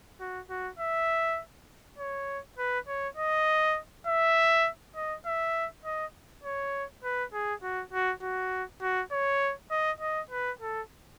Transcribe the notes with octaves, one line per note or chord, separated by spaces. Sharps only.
F#4
F#4
E5
C#5
B4
C#5
D#5
E5
D#5
E5
D#5
C#5
B4
G#4
F#4
F#4
F#4
F#4
C#5
D#5
D#5
B4
A4